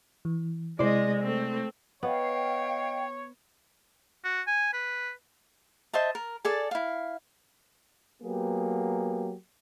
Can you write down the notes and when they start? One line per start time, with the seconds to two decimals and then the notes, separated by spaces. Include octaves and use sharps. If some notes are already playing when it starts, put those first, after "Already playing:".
0.25 E3
0.79 C3 G#3 E4 C5 D5 D#5
1.21 A3 C4
2.03 B3 C#5 D#5 F5 G5
4.24 F#4
4.47 G#5
4.73 B4
5.93 C5 D#5 E5 A5
6.15 A#4
6.45 G#4 A4 D5
6.71 E4 F5
8.22 F#3 A#3 B3 G4 G#4